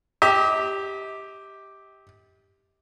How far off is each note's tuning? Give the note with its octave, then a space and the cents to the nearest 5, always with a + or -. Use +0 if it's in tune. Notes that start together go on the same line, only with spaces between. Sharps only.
G4 +0 D#5 +45